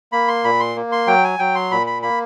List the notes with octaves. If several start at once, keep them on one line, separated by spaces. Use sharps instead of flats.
A#3 B5
C6
A#2 B5
C6
A#3
C6
F#3 G5
G#5
F#3 G5
C6
A#2 B5
B5
A#3 B5